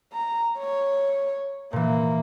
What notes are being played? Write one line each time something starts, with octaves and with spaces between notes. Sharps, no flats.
A#5
C#5
A#2 E3 A#3